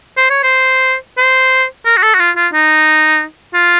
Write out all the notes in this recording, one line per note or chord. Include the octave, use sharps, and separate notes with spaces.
C5
C#5
C5
C5
A#4
F#4
A4
F#4
F4
F4
D#4
F4